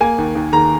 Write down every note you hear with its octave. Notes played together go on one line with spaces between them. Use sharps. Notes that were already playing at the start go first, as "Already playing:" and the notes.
A#3 G#5
D#2
D#2
D#3 A#5